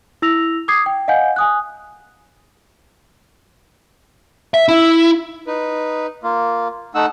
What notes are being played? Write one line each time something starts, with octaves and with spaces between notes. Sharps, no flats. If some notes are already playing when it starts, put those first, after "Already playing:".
E4 E6 A#6 F7
D6 D#6 G#6 C7
G5
D#5 F5 F#5 G#5 G6
G#5 D#6 F#6
E5
E4
D#4 B4
A#3 F4
A3 D#4 F#5 E6